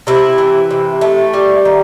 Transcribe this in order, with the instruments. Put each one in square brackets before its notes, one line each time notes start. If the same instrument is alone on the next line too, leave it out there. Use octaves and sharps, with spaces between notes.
[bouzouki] C3 E4
E3
C3
A3
G3
D#3